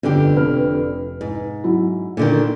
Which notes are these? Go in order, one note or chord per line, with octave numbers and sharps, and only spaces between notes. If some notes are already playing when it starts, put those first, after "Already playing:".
G1 F2 D3 G4
F1 B4 F6
G#2
F#3 E4
A#2 D3 D#3